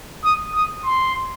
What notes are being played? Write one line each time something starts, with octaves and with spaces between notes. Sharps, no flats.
D#6
D#6
C6